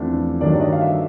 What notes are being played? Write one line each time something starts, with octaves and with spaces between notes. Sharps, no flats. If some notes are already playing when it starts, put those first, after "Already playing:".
Already playing: E2 C3 F3 A3 D4
G2 D#3 F#3 A3 D4 D5
D#5
F5
E5